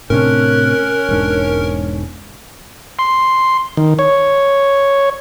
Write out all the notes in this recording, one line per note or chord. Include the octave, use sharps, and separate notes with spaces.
A2 C3 C#4 D4 A#4 F#6
E1 G#2 D4
C6
D#3
C#5